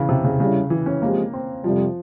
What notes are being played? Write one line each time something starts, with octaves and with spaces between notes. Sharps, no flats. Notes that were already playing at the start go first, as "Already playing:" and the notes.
Already playing: C#3 E3
C3
C#3
C#3 G3 C#4 E4
E3
C#4
F3 G#3 A#3 C4 G4
C4
F2 C3 F3 G3